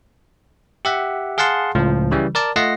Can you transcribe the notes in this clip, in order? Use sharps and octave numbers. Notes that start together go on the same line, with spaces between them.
G4 E5 F#5
G#4 F5 F#5 A5 C6
C#2 A2 F3
C#3 E3 G3
A#4 D5 A5
A3 F4 D#5 F#5 A#6 C7